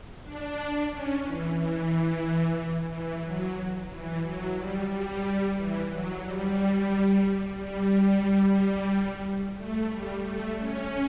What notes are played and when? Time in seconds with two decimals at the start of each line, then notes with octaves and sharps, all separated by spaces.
0.24 D4
0.90 C#4
1.23 E3
1.56 E3
2.90 E3
3.23 F#3
3.91 E3
4.23 F#3
4.56 G3
4.90 G3
5.56 E3
5.90 F#3
6.24 G3
7.57 G3
9.57 A3
9.90 G3
10.23 A3
10.56 C#4